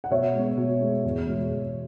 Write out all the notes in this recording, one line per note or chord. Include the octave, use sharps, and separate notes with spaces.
F#5
B2 C#5 E5
G#3 B3
B2
G#3 B3
E2
B2 G#3
E2